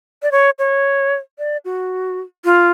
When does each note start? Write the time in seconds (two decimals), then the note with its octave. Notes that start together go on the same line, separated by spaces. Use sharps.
0.23 D5
0.32 C#5
0.59 C#5
1.39 D5
1.65 F#4
2.45 F4